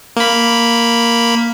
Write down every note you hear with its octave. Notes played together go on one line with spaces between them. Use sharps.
A#3 B5